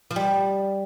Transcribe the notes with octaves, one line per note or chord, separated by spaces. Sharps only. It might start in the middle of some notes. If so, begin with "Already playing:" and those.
F3
G3